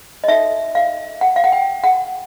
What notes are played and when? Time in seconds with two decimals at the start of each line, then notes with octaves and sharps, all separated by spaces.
0.24 D#5
0.28 D#4 F#4 A4 E5
0.75 F5
1.21 F#5
1.36 F5
1.44 F#5
1.52 G5
1.84 F#5